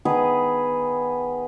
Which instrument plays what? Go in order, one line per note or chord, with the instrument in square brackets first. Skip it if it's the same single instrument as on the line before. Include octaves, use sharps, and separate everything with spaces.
[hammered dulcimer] D#3 B3 G#4 B4